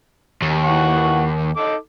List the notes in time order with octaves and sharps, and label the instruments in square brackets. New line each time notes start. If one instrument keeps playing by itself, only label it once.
[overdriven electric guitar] D#2
[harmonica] E3 F#5 C#6
D#4 A4 D6